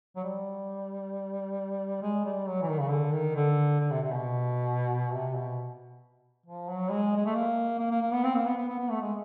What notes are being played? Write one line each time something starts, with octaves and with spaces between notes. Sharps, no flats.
F#3
G3
G#3
G3
F#3
E3
D#3
C#3
D3
D#3
D3
D3
C3
C3
B2
C3
B2
F3
F#3
G#3
G#3
A3
A#3
A#3
A#3
A#3
B3
C4
A#3
B3
B3
B3
B3
A3
G#3